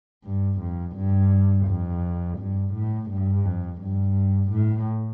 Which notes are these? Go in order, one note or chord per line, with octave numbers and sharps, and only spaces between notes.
G2
F2
G2
F2
G2
A2
G2
F2
G2
A2